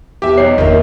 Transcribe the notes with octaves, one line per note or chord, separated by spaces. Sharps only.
E2 E3 B3 G4 E5 D6
B1 C#5 D#5 C7
E2 A#2 D#3 F4 A#4 E5